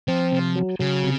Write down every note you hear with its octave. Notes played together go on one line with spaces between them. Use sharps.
F3 C4
C3
F#3
C#3 F#3
C3